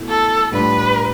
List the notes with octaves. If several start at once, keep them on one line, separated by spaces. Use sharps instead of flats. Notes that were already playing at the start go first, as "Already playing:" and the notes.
Already playing: B2 A3 E4
A4
A2 G3 D4 F4 B4